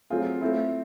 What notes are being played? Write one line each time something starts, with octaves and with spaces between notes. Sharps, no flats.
F#3 A3 C4 F4 G#4
A3 C4 E4